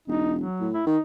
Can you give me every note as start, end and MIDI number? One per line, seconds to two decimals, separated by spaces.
0.08 0.43 28
0.08 0.33 63
0.39 0.68 54
0.60 0.81 45
0.74 0.82 64
0.86 0.97 51
0.86 1.01 63